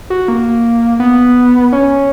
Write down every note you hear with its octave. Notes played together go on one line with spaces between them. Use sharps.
F#4
A#3
B3
C#4